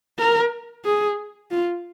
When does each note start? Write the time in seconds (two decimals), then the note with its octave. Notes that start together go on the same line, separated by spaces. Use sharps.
0.19 A#4
0.85 G#4
1.51 F4